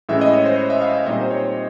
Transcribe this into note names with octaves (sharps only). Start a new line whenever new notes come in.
A2 E3 G#3 C#4 E4 E5
D#5
C#5
C5
C#5
E5
F5
E5
A#2 G3 C4 D#4 D#5
C5
C#5